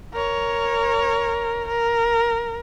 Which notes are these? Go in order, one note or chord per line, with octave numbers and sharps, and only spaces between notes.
A#4 C#5
A#4